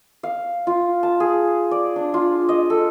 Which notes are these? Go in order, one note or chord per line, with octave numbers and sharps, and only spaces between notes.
F5
F4
A5
G#4
D5
D4
F4
D#5
A4